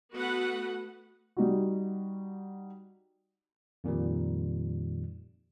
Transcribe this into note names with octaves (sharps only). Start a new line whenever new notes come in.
A3 B3 F#4 B4 F#5
G3 D#4 F#4
F2 A#2 D#3 G3